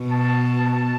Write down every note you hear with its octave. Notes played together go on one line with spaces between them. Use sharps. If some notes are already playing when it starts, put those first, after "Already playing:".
Already playing: B2
A5
A5